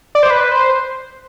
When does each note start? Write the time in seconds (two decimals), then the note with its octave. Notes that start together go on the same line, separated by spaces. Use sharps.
0.15 D5
0.23 C5
0.30 B4
0.51 C5